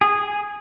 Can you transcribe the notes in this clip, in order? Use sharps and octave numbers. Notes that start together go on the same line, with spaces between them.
G#4